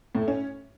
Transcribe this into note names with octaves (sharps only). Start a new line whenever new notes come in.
A2
A3
C#4